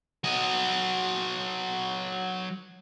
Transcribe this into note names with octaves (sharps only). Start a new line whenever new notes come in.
F#3 D#5